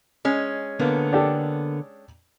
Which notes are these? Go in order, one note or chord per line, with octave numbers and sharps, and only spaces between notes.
G#3 C#4
D3 A#3 B3
D4 G4 A4